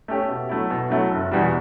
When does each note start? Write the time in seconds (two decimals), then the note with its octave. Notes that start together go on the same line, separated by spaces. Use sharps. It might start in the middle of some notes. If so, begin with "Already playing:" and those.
0.08 A3 C#4 G4
0.29 B2
0.49 F#3 A3 E4
0.70 B2
0.90 F#3 A3 E4
1.11 F#1
1.32 E2 B2 G3